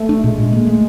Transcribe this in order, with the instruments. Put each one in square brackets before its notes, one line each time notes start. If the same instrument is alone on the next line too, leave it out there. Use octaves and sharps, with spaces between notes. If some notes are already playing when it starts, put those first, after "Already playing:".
Already playing: [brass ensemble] A3
[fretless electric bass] D4
[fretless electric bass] A#2 [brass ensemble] G#3
[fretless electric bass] A#2
A#3
A3